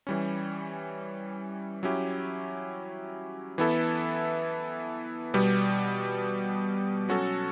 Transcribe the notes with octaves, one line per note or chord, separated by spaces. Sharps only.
E3 G3 C#4
F#3 C#4 E4 G4
E3 B3 E4 A4
B2 G3 B3
F#3 C#4 F#4 A4